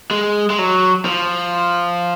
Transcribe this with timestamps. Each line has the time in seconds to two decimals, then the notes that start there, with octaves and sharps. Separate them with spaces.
0.11 G#3
0.50 G#3
0.59 F#3
1.05 F3